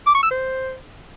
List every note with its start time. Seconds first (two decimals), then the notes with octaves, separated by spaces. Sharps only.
0.06 D6
0.15 C#6
0.23 E6
0.31 C5